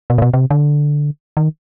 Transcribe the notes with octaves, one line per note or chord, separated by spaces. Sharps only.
B2
A#2
B2
C3
D3
D#3